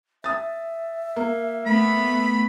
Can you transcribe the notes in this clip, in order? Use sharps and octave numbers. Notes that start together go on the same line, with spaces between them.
E5 D#6 A6
A#3
A3 B3 B5